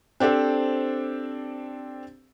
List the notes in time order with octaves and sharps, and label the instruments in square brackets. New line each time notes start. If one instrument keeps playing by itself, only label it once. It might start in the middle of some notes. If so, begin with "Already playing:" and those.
[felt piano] C4 D4 G4 A4 C5